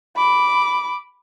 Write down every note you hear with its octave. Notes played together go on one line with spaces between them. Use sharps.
B5 D6